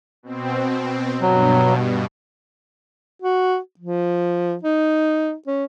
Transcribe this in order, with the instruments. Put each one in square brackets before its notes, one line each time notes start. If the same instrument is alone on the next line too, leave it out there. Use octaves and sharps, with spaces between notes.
[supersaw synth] B2 C4
[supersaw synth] G2 B2 [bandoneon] F#3
[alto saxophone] F#4
F3
D#4
C#4